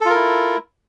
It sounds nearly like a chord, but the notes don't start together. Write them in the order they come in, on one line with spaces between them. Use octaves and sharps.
A4 F4 A#4 E4